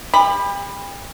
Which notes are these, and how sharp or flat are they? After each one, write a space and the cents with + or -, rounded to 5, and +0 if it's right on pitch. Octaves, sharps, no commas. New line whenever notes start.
G4 +40 B5 +0